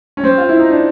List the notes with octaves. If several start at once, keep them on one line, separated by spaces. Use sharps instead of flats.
C#4
C4
F4
E4
D#4
D4